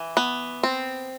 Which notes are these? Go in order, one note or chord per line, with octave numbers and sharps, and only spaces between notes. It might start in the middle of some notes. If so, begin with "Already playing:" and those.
Already playing: E3
B3
C4